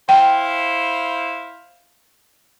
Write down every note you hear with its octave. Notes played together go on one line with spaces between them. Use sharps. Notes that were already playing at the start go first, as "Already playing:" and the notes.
E4 C5 F5 G5